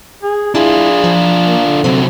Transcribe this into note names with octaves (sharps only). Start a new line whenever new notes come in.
G#4
D4 E4 F4 G#4
F3
A#3
D3
C3 F#3 C4